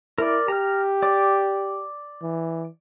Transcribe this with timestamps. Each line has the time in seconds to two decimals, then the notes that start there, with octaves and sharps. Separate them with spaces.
0.18 E4 A#4 D5
0.48 G4 A#5 F6
1.02 D5 D6
2.22 E3